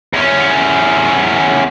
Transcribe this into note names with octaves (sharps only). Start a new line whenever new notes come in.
E2 C#4